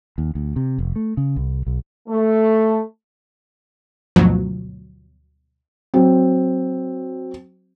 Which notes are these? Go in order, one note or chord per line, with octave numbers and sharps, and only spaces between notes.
D#2
D2
C3
F1
A3
C#3
C2
B1
A3
D2 G2 B2 F3 F#3
F#3 C4